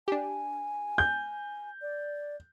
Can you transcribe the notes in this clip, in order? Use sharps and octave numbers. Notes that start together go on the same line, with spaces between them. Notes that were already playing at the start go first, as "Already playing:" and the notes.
D4 G4 G#5
G6
D5